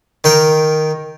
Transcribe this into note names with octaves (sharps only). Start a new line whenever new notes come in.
D#3 A#4 G5